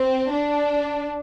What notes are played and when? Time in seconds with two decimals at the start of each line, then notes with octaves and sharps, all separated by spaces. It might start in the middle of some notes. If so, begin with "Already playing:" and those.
Already playing: C4
0.33 D4